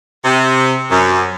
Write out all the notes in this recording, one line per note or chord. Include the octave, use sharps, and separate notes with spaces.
C3
F#2